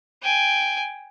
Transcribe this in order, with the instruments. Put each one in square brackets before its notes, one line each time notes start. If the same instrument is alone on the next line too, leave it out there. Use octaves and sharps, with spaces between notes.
[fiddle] G5 G#5